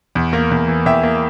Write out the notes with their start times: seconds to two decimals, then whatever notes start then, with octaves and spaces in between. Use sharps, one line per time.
0.15 E2
0.33 A#3
0.51 E2
0.68 E3
0.86 E2 E5 G5
1.03 A#3